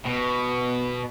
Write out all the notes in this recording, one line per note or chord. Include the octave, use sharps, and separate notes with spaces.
B2